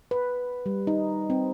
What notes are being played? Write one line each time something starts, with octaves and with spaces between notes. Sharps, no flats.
B4
G3
D#4
C4